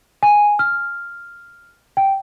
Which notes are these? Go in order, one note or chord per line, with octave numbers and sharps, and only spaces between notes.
G#5
F6
G5